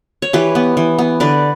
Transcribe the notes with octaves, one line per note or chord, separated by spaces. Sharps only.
C#5
E3 G4 B4
B3
E3
B3
D3 B4 D5